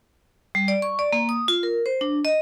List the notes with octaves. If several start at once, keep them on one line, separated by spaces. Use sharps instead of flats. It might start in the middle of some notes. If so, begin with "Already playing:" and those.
G3
D5
C#6
D5
A#3
D#6
F4
A#4
C5
D4
D#5